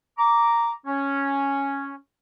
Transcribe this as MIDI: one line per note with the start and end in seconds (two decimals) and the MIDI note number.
0.18 0.70 82
0.18 0.70 86
0.86 1.95 61